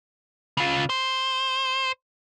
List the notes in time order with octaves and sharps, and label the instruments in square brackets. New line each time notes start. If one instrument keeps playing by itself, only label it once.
[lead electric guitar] C#3 F4
C5